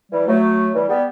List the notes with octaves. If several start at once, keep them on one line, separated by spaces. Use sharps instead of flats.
E3 G3
F#3 A3
E3 G3
G3 B3